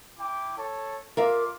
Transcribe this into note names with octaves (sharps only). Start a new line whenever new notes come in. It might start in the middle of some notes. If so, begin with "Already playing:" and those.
E4 G5 D6
A4 C#5 A5
F4 A#4 E5 F5 D6